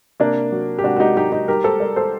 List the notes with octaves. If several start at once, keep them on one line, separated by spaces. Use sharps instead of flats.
C3 A#3 D4
F#3
G4
C3 D4 F#4
F#4
D#4 G4
F#3 D#4 G4
D#4 G4
G3 G4 A#4
A4 C5
G3 A#4 D5
A4 C5